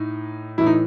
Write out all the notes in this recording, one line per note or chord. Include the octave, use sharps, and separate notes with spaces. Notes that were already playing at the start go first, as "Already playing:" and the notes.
Already playing: A2 D#4
A2 E3 E4
D#4